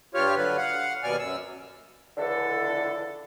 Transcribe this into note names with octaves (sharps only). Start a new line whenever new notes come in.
G2 F4 G4 C#5 F6
D3 F#3 B4
F5 F#5
D#2 B2 D5 G#5 F6
F#2 E6
C#2 D3 E3 A4